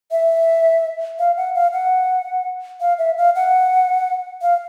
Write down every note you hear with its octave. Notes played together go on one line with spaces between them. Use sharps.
E5
F5
F#5
F5
F#5
F5
E5
F5
F#5
F5